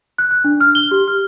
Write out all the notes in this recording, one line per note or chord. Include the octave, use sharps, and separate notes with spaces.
F#6
F#6
D4
F6
G7
G4
F6